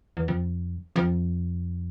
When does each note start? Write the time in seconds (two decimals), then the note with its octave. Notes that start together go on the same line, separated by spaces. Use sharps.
0.17 E2
0.28 F2
0.96 F2